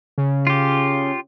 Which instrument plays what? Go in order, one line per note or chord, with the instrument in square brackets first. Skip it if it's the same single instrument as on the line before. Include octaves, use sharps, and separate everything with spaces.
[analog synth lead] C#3
[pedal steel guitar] F4 G4